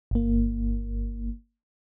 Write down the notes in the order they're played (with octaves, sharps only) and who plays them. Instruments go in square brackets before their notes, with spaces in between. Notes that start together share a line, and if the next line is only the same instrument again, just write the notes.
[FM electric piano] G1 A#3